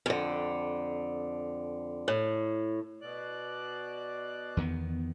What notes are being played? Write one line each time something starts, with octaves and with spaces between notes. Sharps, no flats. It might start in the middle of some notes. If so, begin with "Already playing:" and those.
F2 D3
A2
B2 D5 F#6
E2 D#3 B3